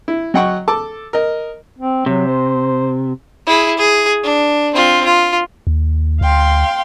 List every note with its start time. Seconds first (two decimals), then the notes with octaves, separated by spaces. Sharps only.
0.08 E4
0.34 F#3 D#5 F#5 G5 C#6
0.68 A4 A5 D6
1.13 A#4 D#5
1.79 C4
2.06 C3 F#3
2.28 C5
3.47 E4 G#4
3.78 G#4
4.24 D4
4.75 C4 F4
5.05 F4
5.67 D#2
6.21 D2 F5 G5 C6